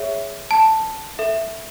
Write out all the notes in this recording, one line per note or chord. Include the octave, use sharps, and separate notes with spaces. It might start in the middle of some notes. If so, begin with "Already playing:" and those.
Already playing: G#4 C#5 E5
A5
A4 E5